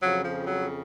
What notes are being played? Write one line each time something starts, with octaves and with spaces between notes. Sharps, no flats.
F2 C#3 F3 F#3
F3
F#3